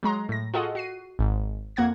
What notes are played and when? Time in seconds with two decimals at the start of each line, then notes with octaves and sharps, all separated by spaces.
0.03 F#3 G#3 A#5 C6
0.29 A2 A#6
0.54 F4 F#4 G#4 A4 D#5 F#5
0.75 F#4 C7 D#7
1.19 G#1 G#2
1.76 F2 A#3 F#5 G#6 A#6